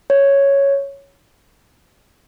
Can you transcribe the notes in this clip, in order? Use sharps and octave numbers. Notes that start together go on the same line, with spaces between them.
C#5